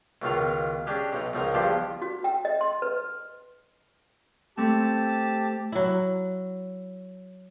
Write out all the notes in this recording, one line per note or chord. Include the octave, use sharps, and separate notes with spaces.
C#2 B2 D#3 F4 F5
C#4 D4 G4 G#4
B1 D#4
C#2 F3 D#4 A#4
E2 G2 F3 G4 A5 C6
F#4
G5
D#5
C6
B4
A3 C4 G4 A5
F#3 E4